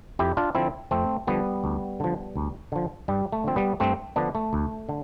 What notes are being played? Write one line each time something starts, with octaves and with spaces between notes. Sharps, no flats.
F2 E4 G4
D4 F4
D3 F3 C4 E4
F2 A3 C4
D3 F3 G3 B3
D2
D3 F3
D2
D3 F3
G2 G3
A3
D3 F3 C4
G3 B3
G2 A3 C4
D3 F3 B3 D4
A3
D2
D3